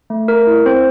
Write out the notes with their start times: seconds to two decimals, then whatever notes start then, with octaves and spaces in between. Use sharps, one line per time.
0.10 A3
0.28 A3 A#4
0.47 E4
0.66 C4 C5